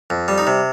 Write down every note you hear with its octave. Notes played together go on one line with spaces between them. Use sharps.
F2
G3
D#4
C3